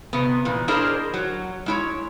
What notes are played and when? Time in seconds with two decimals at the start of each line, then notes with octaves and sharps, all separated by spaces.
0.13 C3 B3
0.45 A#2 E3
0.68 D4 E4 G#4 A#4 C5 D#5
1.14 F#3
1.66 G#3 E4 C#5